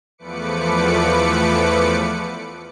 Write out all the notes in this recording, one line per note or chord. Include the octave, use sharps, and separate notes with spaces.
E2 F3 A3 B4 D6 C#7